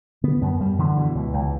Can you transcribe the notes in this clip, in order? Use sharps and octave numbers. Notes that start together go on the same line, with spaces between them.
D3 B3
F#2 B3
F#2 G3
D3 E3
B2 E3
C#2
C#2